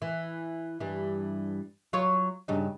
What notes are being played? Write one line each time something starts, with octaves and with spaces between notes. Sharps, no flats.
E3
G2 E3
F#3 F4 C#5
G2 C#3 D#4